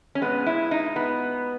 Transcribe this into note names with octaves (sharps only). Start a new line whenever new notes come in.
C#4
A#2 G#3 B3
E4
D#4
B3